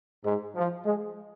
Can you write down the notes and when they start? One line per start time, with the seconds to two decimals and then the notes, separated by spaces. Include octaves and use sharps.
0.25 G#2
0.55 F3
0.84 G#3